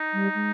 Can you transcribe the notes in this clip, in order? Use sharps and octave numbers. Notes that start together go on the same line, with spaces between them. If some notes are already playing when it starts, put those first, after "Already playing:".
Already playing: D#4
G3
G#3